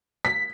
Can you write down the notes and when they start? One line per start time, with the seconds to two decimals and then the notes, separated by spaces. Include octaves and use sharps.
0.25 B6